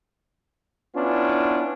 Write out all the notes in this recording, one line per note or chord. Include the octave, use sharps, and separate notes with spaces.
B3 C#4 D4 E4 F4